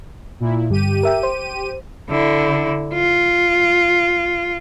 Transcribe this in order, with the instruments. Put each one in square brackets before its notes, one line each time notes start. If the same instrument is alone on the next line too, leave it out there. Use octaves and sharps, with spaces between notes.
[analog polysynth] A#2 E4
[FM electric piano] G2 D3 [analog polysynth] G4 D#7
[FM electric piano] A#4 E5 G5
C5
[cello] D3 E4
F4